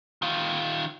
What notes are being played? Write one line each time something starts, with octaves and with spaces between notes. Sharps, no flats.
D#3 F4